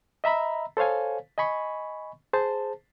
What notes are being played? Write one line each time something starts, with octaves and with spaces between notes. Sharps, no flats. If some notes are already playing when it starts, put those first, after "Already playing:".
D#5 E5 A#5 B5 E6
A4 C5 C#5 F5 G#5
D#5 G#5 B5 C#6
G#4 C5 A5